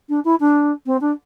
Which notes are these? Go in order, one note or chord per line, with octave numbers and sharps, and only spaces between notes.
D4
E4
D4
C4
D4